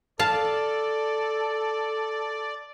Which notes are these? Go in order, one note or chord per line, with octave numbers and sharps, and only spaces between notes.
A4 D5 F5 A5